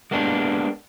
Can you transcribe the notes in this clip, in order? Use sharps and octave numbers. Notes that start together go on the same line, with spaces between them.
G#3 A#3 B3 D4 D#4 G4